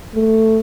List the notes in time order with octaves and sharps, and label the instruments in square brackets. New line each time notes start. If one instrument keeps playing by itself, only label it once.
[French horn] A3